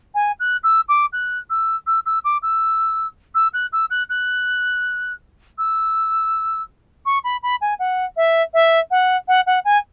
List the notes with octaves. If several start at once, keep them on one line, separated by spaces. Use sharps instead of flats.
G#5
F#6
E6
D6
F#6
E6
E6
E6
D6
E6
E6
F#6
E6
F#6
F#6
E6
C#6
B5
B5
G#5
F#5
E5
E5
F#5
F#5
F#5
G#5